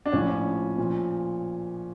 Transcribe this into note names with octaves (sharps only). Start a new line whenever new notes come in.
D4
A#1 A2 F3 C#4
A#2 F3